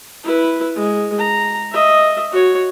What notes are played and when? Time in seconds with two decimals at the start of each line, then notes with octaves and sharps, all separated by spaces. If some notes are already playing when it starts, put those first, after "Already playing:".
0.24 E4 B4
0.76 G#3
1.18 A#5
1.72 D#5 E5
2.32 F#4 C#5